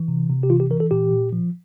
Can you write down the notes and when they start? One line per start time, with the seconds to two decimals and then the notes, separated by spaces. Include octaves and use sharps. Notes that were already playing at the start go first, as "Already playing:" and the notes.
Already playing: E3
0.08 C3
0.30 C3
0.43 G4
0.50 E3 F4
0.60 G4
0.70 E3 A#4
0.80 A4
0.91 A#2 G4
1.11 A#2
1.33 F3